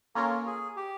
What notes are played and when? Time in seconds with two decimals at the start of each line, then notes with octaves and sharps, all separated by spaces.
0.15 A#3 C#4 F4 A4 A#4 C#5
0.47 G#4
0.76 G4